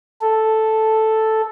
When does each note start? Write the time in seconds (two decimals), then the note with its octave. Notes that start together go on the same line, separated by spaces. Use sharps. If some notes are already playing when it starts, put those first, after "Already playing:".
0.21 A4